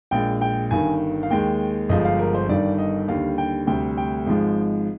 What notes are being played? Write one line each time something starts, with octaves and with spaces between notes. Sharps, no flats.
A#1 A#2 G#3 G5
G5
G1 G2 D#3 G#5
F5
D#2 D#3 G#3 G5
G1 G2 F3 G#3 D#5
F5
A#4
C5
G1 G2 D#3 D5
D#5
D#2 D3 G3 F5
G5
D2 C3 G3 G5
G5
G#1 G#2 F3 G#3